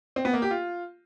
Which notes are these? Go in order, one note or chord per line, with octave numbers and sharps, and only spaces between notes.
C4
B3
A#3
G4
F4